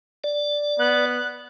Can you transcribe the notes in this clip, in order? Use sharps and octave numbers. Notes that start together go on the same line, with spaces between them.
D5
B3 F#6